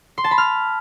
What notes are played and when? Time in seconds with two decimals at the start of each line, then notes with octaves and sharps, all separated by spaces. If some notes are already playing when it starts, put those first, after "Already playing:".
0.18 C6
0.24 A5
0.31 B5
0.38 F6